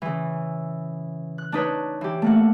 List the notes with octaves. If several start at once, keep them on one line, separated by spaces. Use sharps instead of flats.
C#3 E3
F#6
D4 D#4 B4 C#5
E3 G4
A3 A#3 F#5